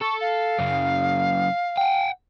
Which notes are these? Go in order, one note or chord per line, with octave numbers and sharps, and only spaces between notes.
A4 C#6
F5
F#2 C#3
F#5 G5